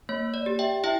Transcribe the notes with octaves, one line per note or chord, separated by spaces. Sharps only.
A#3 C#5
D5
G4
E5 G5
E4 E5 G5